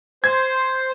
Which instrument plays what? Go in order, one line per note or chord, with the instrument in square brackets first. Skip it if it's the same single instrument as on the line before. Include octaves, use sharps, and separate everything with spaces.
[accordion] C5 [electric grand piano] G#6